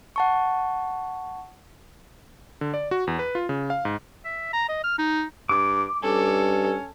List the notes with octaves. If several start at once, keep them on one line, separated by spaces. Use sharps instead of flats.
F#5 A5 C#6
D3
D5
F#4
E2
B4
F4
C#3
F5
G#2
E5
A#5
D#5
F6
D#4
G2 D6
G2 C#4 A4